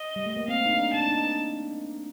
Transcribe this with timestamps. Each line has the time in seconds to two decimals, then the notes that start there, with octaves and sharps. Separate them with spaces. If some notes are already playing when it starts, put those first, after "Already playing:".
Already playing: D#5
0.16 G3
0.26 A3
0.37 A#3
0.48 C4 F5
0.66 D#4
0.70 D4
0.93 D4 A5
1.08 D#4